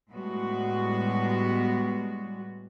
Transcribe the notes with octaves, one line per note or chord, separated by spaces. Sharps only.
A2 G3 G#3 B3 F#4